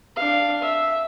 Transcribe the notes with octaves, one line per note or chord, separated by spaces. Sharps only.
D4 F5
E5